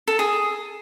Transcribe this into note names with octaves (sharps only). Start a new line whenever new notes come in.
A4
G#4